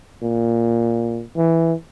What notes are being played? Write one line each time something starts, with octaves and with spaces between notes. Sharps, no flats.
A#2
E3